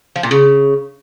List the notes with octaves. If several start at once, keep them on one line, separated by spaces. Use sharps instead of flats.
F3
A#2
C#3